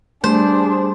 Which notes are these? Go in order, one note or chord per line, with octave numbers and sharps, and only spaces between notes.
G3 A3 D4 G#4 C5